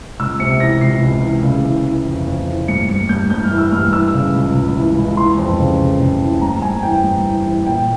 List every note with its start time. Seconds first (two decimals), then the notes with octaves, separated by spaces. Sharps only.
0.19 C#2 E6
0.39 C3 C#7
0.60 E3 A#6
0.81 C#2 C7
1.02 C#2
1.23 E3
1.44 C#3
1.64 E3
1.85 E3
2.05 F2
2.26 F2
2.47 E3
2.68 G2 C#7
2.89 G2 C#7
3.09 G2 G6
3.30 G2 G6
3.44 F6
3.51 E3
3.58 E6
3.71 G2 F6
3.92 E3 E6
4.14 C#3
4.34 C#2
4.55 C#2
4.76 E3
4.97 C#2
5.17 E3 C6
5.38 F2
5.59 C#3
5.80 C#3
6.00 C#3
6.21 E3
6.41 G2 A#5
6.62 G2 G#5
6.83 E3 G5
7.04 G2
7.25 E3
7.46 E3
7.66 A#2 G5